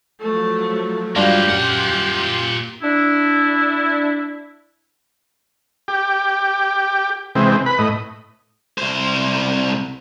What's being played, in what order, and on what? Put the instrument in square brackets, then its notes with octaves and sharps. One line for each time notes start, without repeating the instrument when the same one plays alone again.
[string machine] F3 F#3 [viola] A3
[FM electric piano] G2 D4 F4 [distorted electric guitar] A#3 B4 [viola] G4
[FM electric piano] F#2 F6 [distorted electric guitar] A#2 F#5 [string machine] C6
[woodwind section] D4 E4
[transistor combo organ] G4
C3 E3 G#3 C4
B4 B5
A2 D#5
[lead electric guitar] C2 C5